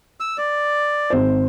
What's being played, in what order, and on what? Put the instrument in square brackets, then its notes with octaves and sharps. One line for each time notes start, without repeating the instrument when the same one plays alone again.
[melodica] E6
D5
[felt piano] G#1 C5